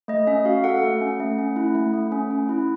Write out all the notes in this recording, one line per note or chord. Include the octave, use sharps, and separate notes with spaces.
A3 D#5
C#4 E5
F#4 F5
A4 F#5
A3
C#4
A3
C#4
E4
A3
A3
C#4
C#4
E4